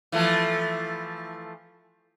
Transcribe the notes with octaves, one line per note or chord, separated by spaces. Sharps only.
E3 F3 A3